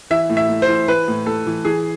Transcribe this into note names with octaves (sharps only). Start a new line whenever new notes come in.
E3 E5
A2
E5
A2
C5
E3
E3 B4
A2
A2 A4
E3
E3 G#4